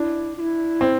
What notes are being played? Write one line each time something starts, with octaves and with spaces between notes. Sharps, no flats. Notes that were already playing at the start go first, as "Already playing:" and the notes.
Already playing: D4 E4
F4
E4
C4